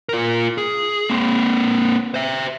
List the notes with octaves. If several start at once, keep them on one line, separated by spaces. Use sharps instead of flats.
F4 A#4
G#4
A#3 C4
C5 E5